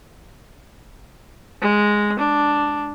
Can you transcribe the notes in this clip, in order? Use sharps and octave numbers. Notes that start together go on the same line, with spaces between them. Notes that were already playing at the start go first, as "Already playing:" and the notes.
G#3
D4